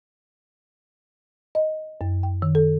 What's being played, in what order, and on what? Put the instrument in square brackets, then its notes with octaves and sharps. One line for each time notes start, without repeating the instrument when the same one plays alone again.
[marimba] D#5
F#2
G5
D#3
A4